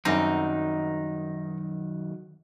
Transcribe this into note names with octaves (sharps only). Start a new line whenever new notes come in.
F#2 D#3 F#3 G3 C4 D#4